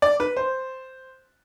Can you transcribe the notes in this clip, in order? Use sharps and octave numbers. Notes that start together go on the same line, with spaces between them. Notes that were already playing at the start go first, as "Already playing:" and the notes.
D5
B4
C5